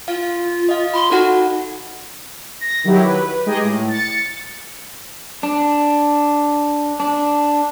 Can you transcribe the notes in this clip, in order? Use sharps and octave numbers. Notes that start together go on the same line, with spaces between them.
F4 F5
D#5 F5
B5 C6
D#4 F#4 A4 F#5
A#6
D#3 F#3 E4 G4
B4
G#3 D#4 G4 G#4 D#5 G5
A2
A6 C#7
D4
D4